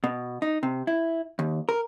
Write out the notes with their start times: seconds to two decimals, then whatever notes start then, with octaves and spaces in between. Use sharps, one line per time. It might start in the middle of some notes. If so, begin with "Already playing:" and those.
0.04 B2
0.42 D#4
0.63 C3
0.87 E4
1.39 D#2
1.69 A#4